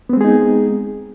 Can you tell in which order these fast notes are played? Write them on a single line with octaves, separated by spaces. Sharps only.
B3 C4 G#3 G#4 D#4